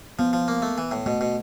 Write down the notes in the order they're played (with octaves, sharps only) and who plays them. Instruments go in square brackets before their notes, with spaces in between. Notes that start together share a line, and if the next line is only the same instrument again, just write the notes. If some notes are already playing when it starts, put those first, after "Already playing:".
[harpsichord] F3 [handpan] B3
[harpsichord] F3
A#3
A3
E3
A2
[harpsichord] B2 [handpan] A3
[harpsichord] B2